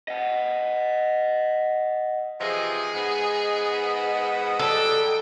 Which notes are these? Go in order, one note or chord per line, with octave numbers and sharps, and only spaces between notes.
D#5 F#5
C3 E3 F3 G#4 D#5
G#2 B3
F#3 G3 A4 G5